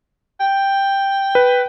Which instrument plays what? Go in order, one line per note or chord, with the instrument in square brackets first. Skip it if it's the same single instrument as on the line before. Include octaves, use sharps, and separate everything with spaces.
[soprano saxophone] G5
[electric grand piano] B4